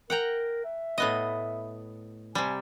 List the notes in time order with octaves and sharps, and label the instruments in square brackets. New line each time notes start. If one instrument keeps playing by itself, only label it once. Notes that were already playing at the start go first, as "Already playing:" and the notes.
[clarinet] A#4 [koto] F#5 G5 A#5
[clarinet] E5
[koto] A2 B3 D#5
[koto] C3 G3 [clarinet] G#5